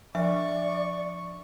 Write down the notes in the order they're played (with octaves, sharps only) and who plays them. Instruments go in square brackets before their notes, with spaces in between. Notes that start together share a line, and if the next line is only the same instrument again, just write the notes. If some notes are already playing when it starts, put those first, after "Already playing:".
[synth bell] F3 D4 [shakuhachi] D5 [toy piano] E5 [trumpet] C#6